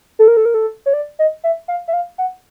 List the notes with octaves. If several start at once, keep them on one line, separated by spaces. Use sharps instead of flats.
A4
A#4
A4
A#4
A4
C#5
D5
D#5
E5
F5
E5
F5
F#5